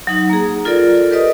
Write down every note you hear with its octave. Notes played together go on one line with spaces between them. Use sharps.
F#3 D#4
A#3 G#4
F4 A4 A#4 D5
G4 A#4 B4 D5 D#5 D#6